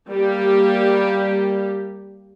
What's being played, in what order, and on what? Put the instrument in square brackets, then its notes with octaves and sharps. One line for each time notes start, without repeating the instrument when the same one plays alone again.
[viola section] G3 A#3 G4